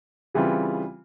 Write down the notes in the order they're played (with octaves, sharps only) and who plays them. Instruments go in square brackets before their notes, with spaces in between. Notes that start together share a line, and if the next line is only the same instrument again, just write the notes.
[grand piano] C#3 E3 G3 C4 F4